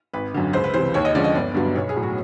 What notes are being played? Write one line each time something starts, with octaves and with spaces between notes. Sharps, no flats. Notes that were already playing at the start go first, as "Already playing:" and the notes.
G#1 B4
F#2 D3
C#2 C5
B4
C3 E3 C5
D#2 C#5
D#5
D3 F3 G#3 C#4 D5
D#5
G1 D5
G2 D3 F#3 B3
B1 C#5
G#4
A2 F#3
F#4